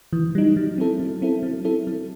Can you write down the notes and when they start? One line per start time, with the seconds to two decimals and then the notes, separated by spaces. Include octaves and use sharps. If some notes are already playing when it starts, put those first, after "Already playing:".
0.13 E3
0.35 G3 D#4
0.57 F#3
0.78 C4 E4 A4
1.00 F#3
1.22 C4 E4 A4
1.43 F#3
1.65 C4 E4 A4
1.87 F#3